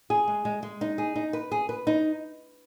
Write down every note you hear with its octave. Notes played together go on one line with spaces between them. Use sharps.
G#4
G#3
G#3
G#3
D#4
G#4
D#4
B4
G#4
B4
D#4